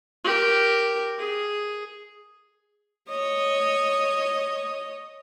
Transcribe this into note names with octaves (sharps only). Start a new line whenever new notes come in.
G4 A#4
G#4
C#5 D#5